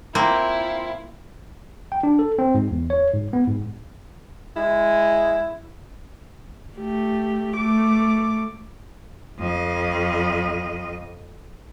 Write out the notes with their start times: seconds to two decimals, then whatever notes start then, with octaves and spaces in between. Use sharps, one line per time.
0.15 A#3 C4 E4 F4
1.92 G5
2.03 D4
2.19 A4
2.38 C4
2.55 G#2
2.71 E2
2.90 C#5
3.14 G#2
3.33 B3
3.48 G#2
4.56 G#3 E4
6.76 A3 G4
7.56 A3 D6
9.39 F2 D#5